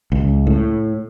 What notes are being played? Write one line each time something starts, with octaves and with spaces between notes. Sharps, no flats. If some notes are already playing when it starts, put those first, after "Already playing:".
C#2
A2